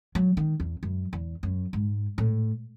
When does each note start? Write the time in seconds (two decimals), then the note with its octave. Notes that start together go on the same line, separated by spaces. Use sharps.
0.15 F#3
0.37 D#3
0.60 E2
0.83 F#2
1.13 E2
1.43 F#2
1.73 G#2
2.18 A2